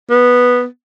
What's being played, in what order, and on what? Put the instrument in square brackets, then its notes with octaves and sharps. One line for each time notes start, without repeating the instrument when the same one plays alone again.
[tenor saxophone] B3